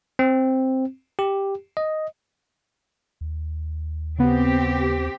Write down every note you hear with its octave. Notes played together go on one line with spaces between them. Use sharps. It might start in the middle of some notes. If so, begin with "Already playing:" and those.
C4
G4
D#5
D#2
C#3 B3 C4 G4